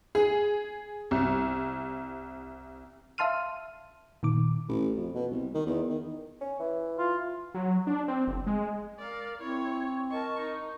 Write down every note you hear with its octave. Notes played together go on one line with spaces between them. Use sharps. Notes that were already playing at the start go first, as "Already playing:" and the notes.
G#4
C2
E5 F5 A5 C6 F6 D#7
A#2 D#3 D6
A1
F2
B2
C2
D#3
E2
D#3
C#4
E3
F4
F#3
D4
C4
F#1
G#3
A#4 D5 F5
C4 E4 C#5 C#6
A#4 D#5 A5 C#6
D#4